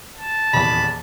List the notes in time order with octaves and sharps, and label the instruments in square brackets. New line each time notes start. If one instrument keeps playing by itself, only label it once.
[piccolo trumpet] A5
[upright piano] D#1 E2 [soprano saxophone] B5